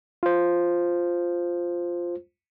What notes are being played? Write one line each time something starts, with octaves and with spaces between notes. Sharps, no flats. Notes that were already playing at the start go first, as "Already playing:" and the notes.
F4 C5